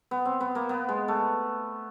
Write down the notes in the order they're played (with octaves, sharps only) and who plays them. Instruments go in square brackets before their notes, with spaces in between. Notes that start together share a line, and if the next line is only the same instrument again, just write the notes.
[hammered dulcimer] B3
C4
B3
A#3
B3
G#3
A3